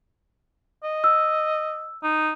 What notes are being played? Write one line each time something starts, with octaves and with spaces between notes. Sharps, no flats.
D#5
E6
D#4